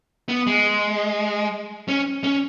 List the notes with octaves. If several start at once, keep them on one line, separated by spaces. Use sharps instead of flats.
B3
G#3
C#4
C#4